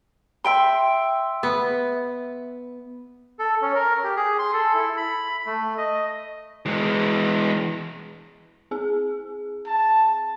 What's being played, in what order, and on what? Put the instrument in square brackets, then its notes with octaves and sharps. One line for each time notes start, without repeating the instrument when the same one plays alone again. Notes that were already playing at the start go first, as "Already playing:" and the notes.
[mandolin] E5 G5 C6
[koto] B3
[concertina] A4
C#4
A#4
G4
G#4
C6
A4
E4
B5
A3
D#5
[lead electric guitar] E3 G#3
[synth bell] C4 G#4
[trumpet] A5